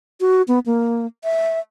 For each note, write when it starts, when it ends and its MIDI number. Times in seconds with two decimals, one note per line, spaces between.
0.21 0.42 66
0.48 0.59 59
0.66 1.06 58
1.24 1.60 76